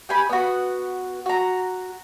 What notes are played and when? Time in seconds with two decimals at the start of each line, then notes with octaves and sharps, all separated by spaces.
0.09 G4 G#5 B5
0.29 B3 F#4
1.26 F#4 A#5